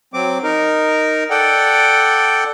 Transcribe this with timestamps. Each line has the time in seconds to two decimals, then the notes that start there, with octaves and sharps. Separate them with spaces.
0.14 F#3 C4 D6
0.43 D#4 A#4
1.30 A4 D5 F#5 G5